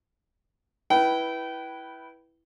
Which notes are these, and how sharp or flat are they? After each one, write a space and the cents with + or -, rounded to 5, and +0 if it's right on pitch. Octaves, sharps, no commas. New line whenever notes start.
E4 +0 B4 -10 G5 -25